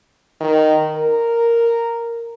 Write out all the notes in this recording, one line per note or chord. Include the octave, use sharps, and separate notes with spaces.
D#3
A#4